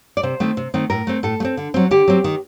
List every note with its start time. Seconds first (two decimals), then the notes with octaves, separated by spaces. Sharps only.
0.17 D5
0.23 C3 C5
0.40 D#3 A3 C4
0.57 C3
0.74 D#3 A3 C4
0.90 A2 A#4
1.07 A3 C4
1.23 A2 A4
1.40 A3
1.45 C4
1.57 D3
1.74 F#3 C4
1.91 D3 G4
2.08 F#3 C4
2.24 D#3